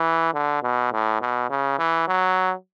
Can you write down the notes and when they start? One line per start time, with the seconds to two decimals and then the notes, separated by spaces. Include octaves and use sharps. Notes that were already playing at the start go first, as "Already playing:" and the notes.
Already playing: E3
0.34 D3
0.63 B2
0.93 A2
1.21 B2
1.50 C#3
1.79 E3
2.08 F#3